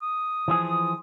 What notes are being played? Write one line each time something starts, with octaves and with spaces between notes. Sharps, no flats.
D#6
E3 F3 G#4